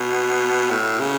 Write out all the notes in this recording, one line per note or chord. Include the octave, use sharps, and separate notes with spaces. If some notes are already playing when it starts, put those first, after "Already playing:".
Already playing: B2
A2
C#3